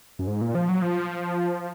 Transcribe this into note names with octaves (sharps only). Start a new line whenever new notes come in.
F#2
G#2
A#2
F3
F#3
F3